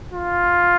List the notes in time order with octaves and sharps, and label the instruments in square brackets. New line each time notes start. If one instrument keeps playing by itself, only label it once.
[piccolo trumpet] F4